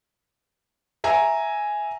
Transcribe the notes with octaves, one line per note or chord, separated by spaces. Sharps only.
E5 G#5 A#5